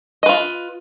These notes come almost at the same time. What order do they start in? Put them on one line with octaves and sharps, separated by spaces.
D#5 B4 F4